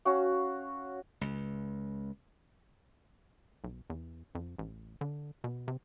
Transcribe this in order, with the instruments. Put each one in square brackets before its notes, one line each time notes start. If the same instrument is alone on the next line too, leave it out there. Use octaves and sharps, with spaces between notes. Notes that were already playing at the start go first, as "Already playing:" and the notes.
[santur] C#4 F#4 F5
[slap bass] C#2
[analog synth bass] B1
E2
F2
A1
D3
B2
C3